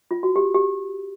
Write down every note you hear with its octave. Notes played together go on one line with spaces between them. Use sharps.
F4
F#4
G4
G4